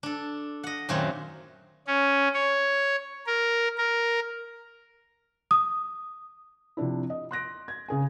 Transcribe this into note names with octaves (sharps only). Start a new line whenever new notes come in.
D4 A4
D#5 F#5
F#2 A#2 D#3 F#3 A3 C4
C#4
C#5
A#4
A#4
D#6
C3 F3 D4 E4
D#5
C6 F#6 A#6 D7
G#6
C#3 G#4 G#5